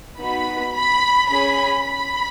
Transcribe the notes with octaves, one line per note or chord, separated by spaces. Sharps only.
B3 D#4 F#4 B5
B5
C#4 G#4 B5
B5